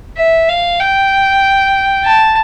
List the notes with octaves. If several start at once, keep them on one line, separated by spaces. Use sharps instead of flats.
E5
F5
G5
A5